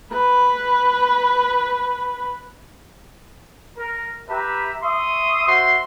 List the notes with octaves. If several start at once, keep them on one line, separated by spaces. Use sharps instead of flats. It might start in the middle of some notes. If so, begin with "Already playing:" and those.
B4 B5
A#4
G4 B4 E5 A#5
E5 C6 C#6 D#6
F#4 C5 E5 C6